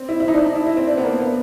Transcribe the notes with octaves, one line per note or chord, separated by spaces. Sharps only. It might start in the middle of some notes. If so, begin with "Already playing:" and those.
Already playing: C4
E4
E4
D#4
D4
D#4
E4
E4
C4
D4
B3
A#3
B3